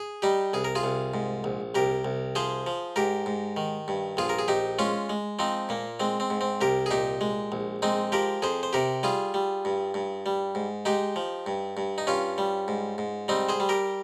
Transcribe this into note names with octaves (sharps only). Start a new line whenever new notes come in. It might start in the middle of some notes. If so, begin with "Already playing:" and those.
Already playing: G#4
G3 D#4 G4
C2 G#4
A#4
F4 G#4
C2
G#2
A#1
C2 G4 A#4
C2
F3 G#4 C5
F3
G#2 G4 A#4
G#2
D#3
G2
A#1 F4 G#4
A#4
G#4
A#1 D#4 G4
G#3 C#4 F4
G#3
F3 C4 D#4
A#2 A#3
G#3 C4
C4
G#2
C4
C2 G4 A#4
G#4
A#2 D#4 G4
G#3
A#1
G#3 C4 D#4
F3 G4 A#4
F2 G#4 C5
C5
C3 G4 A#4
G3 F4 G#4
G3
G2
G2
G3
G#2
G#3 D#4 G4
F3
G2
G2
D#4
G2 C#4 F4
G3
G#2
G#2
G3 C4 D#4
G#4 C5
G3
G4 A#4